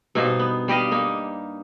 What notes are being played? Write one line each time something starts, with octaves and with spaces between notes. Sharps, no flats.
G2 B2 D#4 C5
B3
G3 G4 D#5 F5
A#3 D#4